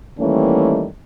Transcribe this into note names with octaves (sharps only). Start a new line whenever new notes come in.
D#3 E3 G3 A3 A#3 C#4